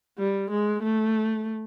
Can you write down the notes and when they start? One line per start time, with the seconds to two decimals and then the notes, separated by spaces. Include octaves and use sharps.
0.19 G3
0.51 G#3
0.83 A3